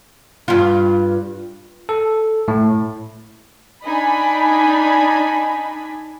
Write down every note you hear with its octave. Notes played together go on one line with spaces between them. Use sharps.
G2 F4
A4
A2
D4 D#4 G#5 B5